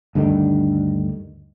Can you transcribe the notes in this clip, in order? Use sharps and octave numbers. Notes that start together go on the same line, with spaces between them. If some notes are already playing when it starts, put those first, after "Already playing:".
D2 G2 D3 D#3